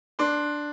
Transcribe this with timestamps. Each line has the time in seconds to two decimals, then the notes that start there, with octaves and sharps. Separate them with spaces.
0.19 D4 C6